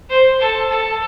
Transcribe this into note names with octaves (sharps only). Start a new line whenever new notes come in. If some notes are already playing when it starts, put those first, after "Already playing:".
C5
A4
A4